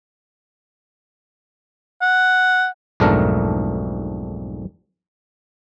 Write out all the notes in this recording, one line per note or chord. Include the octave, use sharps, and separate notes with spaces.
F#5
B1 F2 G#2 A3 D4 A#4